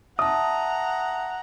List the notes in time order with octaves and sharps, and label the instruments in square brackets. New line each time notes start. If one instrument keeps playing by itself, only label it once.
[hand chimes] E5 A5 [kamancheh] F#5 A#5 [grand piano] D#6